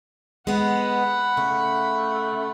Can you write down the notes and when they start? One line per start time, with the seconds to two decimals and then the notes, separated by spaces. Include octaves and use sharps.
0.47 G#3 B3 F#5 B5
1.37 C#3 A3